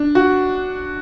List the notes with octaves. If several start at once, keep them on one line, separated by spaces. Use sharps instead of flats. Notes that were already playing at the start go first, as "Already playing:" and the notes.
Already playing: D4
F#4